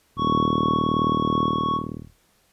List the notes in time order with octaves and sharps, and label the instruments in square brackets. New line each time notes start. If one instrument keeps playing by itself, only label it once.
[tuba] D#1 [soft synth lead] C#6